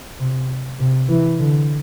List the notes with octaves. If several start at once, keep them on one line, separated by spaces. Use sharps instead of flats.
C3
C3
E3
D3